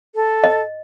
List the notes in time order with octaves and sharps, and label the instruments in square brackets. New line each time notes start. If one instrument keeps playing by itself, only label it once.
[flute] A4
[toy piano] D#5